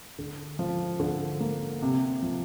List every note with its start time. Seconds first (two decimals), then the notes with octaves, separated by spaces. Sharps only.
0.19 D3
0.59 F3
1.00 D3
1.40 A#3
1.82 C3
2.23 F3